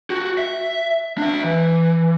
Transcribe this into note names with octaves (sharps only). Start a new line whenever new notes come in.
F#4 G4
E5
D4 E5
E3